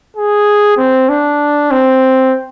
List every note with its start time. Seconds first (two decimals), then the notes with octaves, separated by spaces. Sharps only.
0.16 G#4
0.77 C4
1.09 D4
1.71 C4